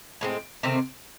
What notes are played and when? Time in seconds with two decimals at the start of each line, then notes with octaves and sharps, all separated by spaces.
0.21 A2 G#3 C4
0.63 C3 D#3 A3 C4